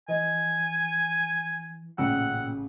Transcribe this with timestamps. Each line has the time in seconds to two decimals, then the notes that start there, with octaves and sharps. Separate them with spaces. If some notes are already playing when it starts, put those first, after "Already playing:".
0.08 E3 D#5 G#5
1.98 A1 A#2 C#3 F#5 G5 E6